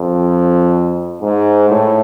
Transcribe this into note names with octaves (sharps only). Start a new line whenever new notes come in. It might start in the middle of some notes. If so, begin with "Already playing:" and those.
Already playing: F2
G#2
A2